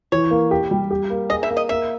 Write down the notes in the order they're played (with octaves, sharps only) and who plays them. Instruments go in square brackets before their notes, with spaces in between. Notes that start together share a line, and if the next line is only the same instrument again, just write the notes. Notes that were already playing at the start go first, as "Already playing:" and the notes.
[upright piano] E3 [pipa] C#5
[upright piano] A#3
G4
G3
G4
A#3
[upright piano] G#4 [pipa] D#5
[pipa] E5
[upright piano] A#3
[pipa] D#5
[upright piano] A#3 [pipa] E5